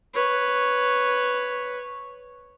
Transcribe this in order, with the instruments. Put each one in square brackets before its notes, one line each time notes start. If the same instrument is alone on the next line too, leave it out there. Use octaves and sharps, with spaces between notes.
[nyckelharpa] B4 C#5